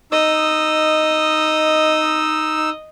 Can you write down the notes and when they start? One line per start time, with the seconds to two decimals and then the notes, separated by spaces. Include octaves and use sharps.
0.12 D#4 D#5 E6